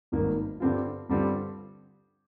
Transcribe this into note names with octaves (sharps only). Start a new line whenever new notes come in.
G#1 G2 D#3 A#3
G2 D3 G3 C4 F4
G2 D3 G3 C4 F4